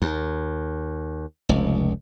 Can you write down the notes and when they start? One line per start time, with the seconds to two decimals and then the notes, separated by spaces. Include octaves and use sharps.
0.02 D#2
1.49 F1 C#2